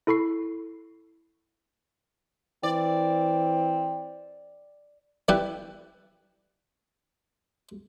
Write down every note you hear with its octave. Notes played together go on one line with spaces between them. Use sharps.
E4 A4 B5 C#6 C7
E3 C4 D5
E3 G3 E4 G4 B4